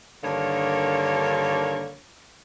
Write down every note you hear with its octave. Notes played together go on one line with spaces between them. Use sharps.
G2 D3 D#3 A#3 C#5